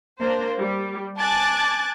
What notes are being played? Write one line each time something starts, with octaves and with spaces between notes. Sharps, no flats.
A#3 D4 C5
G3
G#5 A5 D6 F#6 G#6 A6